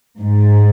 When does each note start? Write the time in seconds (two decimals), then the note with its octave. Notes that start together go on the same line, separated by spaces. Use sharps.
0.22 G#2